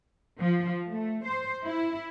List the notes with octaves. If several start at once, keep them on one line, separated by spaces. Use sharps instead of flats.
F3
A3
C5
E4